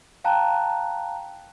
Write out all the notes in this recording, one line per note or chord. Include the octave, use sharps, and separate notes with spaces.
F5 G5 A5 A#5 F#6